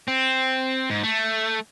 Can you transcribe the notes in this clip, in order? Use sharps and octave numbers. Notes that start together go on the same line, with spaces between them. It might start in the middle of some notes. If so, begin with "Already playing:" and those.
C4
G#2
A3